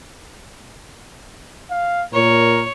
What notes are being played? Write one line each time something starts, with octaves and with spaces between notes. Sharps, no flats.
F5
A#2 A#4 C#5